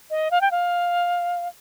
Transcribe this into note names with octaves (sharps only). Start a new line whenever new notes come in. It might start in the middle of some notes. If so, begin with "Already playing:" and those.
D#5
F5
G5
F5